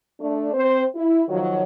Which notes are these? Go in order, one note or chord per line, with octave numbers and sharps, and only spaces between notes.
A3 D4
C4 C5
E4
D#3 F3 F#3